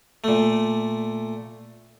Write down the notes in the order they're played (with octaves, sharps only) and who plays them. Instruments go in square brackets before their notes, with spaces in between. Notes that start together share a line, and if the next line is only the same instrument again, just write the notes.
[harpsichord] A#2 A3